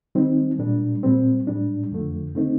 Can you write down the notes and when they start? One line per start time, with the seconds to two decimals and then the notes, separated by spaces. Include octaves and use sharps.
0.15 D#3 G3 C4 D#4
0.59 A#2 G3 D4
1.03 A#2 G3 C4
1.47 A2 G3 D4
1.91 F2 D3 F3 A3
2.35 D3 A3 C4 D#4